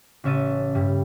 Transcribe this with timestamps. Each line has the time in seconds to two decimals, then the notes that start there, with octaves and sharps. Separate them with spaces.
0.24 A1 C#3 C#4 E5 A6 D#7
0.75 G2 G3